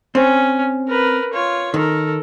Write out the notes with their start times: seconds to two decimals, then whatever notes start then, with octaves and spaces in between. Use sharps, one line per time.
0.15 C4 C#4
0.88 A#4 B4
1.33 F4 C#5
1.74 D#3 A4 A#4